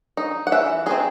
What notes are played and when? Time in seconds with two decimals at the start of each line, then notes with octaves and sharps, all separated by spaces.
0.17 D#4
0.47 F#5
0.52 E3 E5
0.86 C4 D#4 G#4